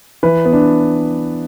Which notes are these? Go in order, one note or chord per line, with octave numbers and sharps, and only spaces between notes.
E3 B4
B3
D4